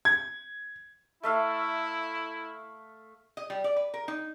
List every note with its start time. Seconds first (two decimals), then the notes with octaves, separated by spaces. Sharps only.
0.05 G#6
1.23 A3 E4 E5 F5
3.37 D#5
3.50 G3
3.64 D5
3.76 B4
3.94 A#4
4.08 D#4